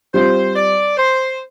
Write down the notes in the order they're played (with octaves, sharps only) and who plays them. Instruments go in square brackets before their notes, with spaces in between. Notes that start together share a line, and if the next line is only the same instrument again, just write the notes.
[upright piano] G3 C4 F4 [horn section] C5
[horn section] D5
C5